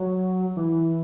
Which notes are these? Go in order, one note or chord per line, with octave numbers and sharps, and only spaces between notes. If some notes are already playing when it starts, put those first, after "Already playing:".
Already playing: F#3
E3